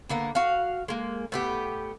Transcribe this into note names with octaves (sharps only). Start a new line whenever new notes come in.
D3 A#3 B3
F#4 F5
G#3 A#3
A2 B3 G4